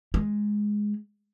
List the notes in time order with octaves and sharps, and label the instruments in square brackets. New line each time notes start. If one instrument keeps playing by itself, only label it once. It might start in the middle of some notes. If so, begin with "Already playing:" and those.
[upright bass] G#3